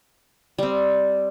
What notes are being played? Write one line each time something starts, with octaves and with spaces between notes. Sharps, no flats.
G3 C4